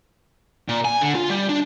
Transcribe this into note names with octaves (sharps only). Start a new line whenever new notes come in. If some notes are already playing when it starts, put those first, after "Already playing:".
A#2
G#5
D3
F4
G3
D4